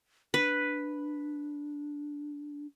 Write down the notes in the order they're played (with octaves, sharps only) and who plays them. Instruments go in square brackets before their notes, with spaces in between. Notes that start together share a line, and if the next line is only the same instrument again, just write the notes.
[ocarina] D4 [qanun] B4